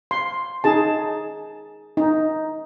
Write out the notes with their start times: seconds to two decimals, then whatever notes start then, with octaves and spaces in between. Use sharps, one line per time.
0.11 C6
0.64 D#4 G#4 A5
1.97 D#4